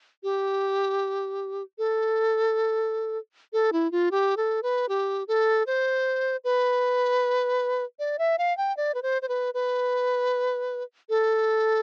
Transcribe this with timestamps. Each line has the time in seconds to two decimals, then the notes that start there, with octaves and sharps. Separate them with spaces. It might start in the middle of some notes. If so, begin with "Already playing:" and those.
0.23 G4
1.78 A4
3.53 A4
3.73 E4
3.92 F4
4.11 G4
4.37 A4
4.63 B4
4.89 G4
5.28 A4
5.67 C5
6.44 B4
7.99 D5
8.19 E5
8.38 F5
8.58 G5
8.77 D5
8.95 B4
9.03 C5
9.22 C5
9.29 B4
9.54 B4
11.09 A4